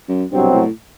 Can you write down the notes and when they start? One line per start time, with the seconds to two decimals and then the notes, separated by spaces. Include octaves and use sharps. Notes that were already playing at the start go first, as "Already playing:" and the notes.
0.09 F#2
0.32 C2 G2 B2 F#3 C4
0.54 A2